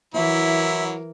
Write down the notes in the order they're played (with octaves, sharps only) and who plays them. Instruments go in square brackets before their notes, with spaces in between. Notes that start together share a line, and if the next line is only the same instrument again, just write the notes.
[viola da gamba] E3 A#4 [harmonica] F#3 E4 [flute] E5